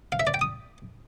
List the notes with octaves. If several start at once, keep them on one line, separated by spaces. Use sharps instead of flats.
F5
E5
D5
G5
D#6